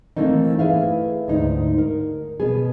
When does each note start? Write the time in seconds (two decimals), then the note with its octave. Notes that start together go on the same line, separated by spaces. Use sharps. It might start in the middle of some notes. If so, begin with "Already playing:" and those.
0.17 E3 A3 A#3 C4 D#4
0.59 E4 G#4 B4 E5 F5
1.28 D2 G#2 D#4
1.78 A#4
2.40 B2 B3 G#4